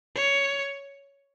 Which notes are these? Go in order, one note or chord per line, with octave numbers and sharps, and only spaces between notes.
C#5